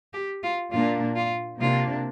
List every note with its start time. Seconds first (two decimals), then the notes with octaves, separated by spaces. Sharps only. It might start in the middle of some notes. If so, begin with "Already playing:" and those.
0.14 G4
0.43 F4
0.72 A#2 A#3 D4 F4
1.16 F4
1.60 C3 A#3 D4 F4